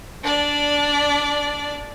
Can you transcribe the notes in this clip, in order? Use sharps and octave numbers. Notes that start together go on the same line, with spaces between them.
D4 D5